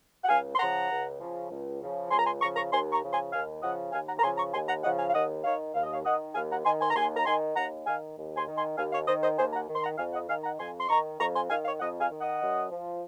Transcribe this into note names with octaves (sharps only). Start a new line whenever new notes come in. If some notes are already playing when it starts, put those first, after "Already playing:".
F#5
C#2 F5 G#5
C6
C#3 F3 F#5 A#5
C#2
C#3 F3
C#2
C#3 F3
C#2 G#5 C6
A#5
G#5 C6
C#3 F3 A#5 C#6
A#5 C#6
D#2 G#5 C6
A#5 C#6
C#3 F3
G#5 C6
D#2 F5 G#5
C#3 F3 D#5 F#5
D#2 F5 G#5
F#5 A#5
A#5
C#3 F3 G#5 C6
A#5 C#6
D#2 G#5 C6
F#5 A#5
C#3 F3 D#5 F#5
F5 G#5
F5
D#2 D#5 F#5
D#3 C#5 F5
D#2 F5
D#5
C#5 F5
D#3 D#5 F#5
D#2 F5 G#5
F#5 A#5
D#3 G#5 C6
G#5 C6
A#5
D#2 G#5 C6
A#5
D#3 G#5 C6
D#2 F#5 A#5
D#3 F5 G#5
D#2
G#5 C6
D#3
G#5 C6
D#2 F5 G#5
C#5 F5
D#3 C5 D#5
C5 D#5
D#2 G#4 C5
F#5 A#5
D#3
C6
F#5 A#5
F2 F5 G#5
D#5 F#5
D#3 F5 G#5
F#5 A#5
F2 G#5 C6
C6
D#3 A#5 C#6
F2 A#5 C#6
G#5 C6
D#3 F5 G#5
C#5 F5
F2 D#5 F#5
F5 G#5
D#3
D#5 F#5
F#2
F3